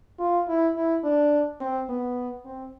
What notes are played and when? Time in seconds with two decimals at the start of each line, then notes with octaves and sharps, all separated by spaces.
0.19 F4
0.48 E4
0.76 E4
1.04 D4
1.60 C4
1.89 B3
2.45 C4